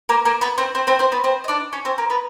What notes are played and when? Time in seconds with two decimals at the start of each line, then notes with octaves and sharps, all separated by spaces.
0.09 A#3 A#4
0.25 A#3 A#4
0.41 B3 B4
0.58 C4 C5
0.75 C4 C5
0.87 C4 C5
0.99 C4 C5
1.12 B3 B4
1.24 C4 C5
1.44 D#5
1.48 D4 D5
1.73 C#4 C#5
1.85 C4 C5
1.98 A#3 A#4
2.10 B3 B4